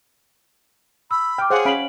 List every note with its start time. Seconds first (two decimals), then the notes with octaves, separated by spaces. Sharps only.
1.11 B5 E6
1.38 G5 D6 F6
1.50 G#4 C5 C#5 F5 F#5
1.65 C#4 F5 B5 D7 F#7